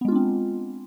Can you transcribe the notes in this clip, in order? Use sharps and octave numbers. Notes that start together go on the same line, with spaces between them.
G#3 B3 C4 D4 F4